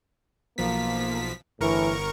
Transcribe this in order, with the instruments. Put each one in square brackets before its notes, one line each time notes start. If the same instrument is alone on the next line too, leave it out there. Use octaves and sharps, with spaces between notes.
[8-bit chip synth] B1 F3 B6 [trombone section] A#3
[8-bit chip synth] G1 A#4 C#6 [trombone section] A2 E3